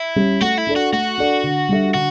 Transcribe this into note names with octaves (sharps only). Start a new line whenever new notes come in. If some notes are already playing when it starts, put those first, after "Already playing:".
Already playing: E4
G3 C#4 G4
A3 F#4
E4
D4 A4 D5
F#4
A3 F#4
D4 A4 D5
D3
G3 D4 A4 E5
D3 F#4